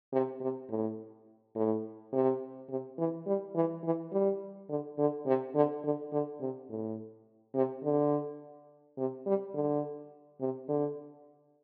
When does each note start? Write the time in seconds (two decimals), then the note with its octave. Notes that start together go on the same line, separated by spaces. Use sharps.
0.13 C3
0.41 C3
0.70 A2
1.55 A2
2.13 C3
2.70 C3
2.98 E3
3.27 G3
3.55 E3
3.83 E3
4.12 G3
4.69 D3
4.98 D3
5.26 C3
5.55 D3
5.84 D3
6.12 D3
6.41 C3
6.70 A2
7.55 C3
7.84 D3
8.98 C3
9.26 G3
9.54 D3
10.41 C3
10.68 D3